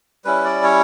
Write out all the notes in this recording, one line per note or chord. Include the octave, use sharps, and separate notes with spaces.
G3 C#4 E4 B4
D5
C#5